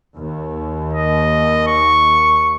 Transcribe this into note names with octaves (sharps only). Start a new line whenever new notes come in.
D#2
D#5
C#6